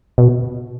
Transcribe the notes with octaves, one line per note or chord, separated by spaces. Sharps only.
B2